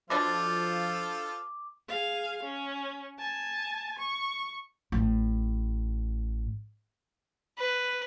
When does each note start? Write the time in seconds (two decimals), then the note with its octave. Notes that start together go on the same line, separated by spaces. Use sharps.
0.10 B2 D3 F3 D4 F4 A4 C5 D6
1.88 G#4 F5
2.42 C#4
3.19 G#5 A5
3.99 C#6
4.92 A1 A2
7.58 B4